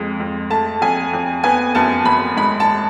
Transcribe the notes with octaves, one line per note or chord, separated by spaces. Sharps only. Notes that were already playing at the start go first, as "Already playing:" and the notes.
Already playing: F2 G#3
F2
A3 A5
F2 G#5
F2
B3 G#5
F#2 A5
F#2 B5
G#3 B5
A5